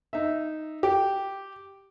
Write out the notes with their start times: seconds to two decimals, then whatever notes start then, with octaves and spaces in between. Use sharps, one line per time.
0.13 D#4 E5
0.83 G4